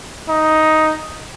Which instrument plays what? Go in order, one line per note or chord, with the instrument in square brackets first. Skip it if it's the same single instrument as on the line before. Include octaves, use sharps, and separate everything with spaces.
[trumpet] D#4